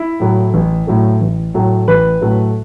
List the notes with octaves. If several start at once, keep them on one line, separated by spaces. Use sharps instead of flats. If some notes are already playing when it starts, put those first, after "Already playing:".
Already playing: E4
A2 F#3 A3
A1
A2 F#3 A3
A1
A2 F#3 A3
A1 B4
A2 F#3 A3